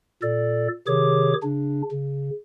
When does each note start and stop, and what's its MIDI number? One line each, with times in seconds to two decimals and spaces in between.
0.23 0.68 46
0.23 0.68 69
0.23 0.68 74
0.87 1.34 48
0.87 1.34 51
0.87 1.34 67
0.87 1.34 68
0.87 1.34 73
0.87 1.34 86
1.43 1.82 49
1.43 1.82 62
1.91 2.30 49